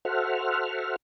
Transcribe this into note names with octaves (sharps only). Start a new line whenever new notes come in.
F#4 A4 C5 E5 F#5 F6